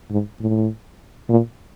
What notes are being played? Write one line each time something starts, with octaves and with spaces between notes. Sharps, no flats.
G#2
A2
A#2